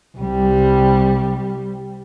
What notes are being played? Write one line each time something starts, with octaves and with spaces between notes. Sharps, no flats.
C2 G3